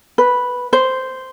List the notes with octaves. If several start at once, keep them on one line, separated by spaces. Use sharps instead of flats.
B4
C5